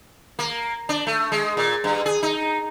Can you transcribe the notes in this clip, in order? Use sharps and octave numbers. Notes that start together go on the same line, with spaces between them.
A#3
D4
A3
G#3
A#2
G2
G#4
D#4